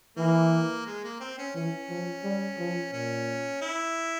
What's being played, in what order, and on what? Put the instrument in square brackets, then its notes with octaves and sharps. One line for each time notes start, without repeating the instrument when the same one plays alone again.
[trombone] E3 [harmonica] A#3
[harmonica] G#3
A#3
C4
C#4
[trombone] E3 [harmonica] C#4
[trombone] F3
G3
F3
[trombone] A#2 [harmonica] C#4
[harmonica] E4